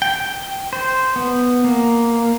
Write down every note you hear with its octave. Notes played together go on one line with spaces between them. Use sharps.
G5
C5
B3
A#3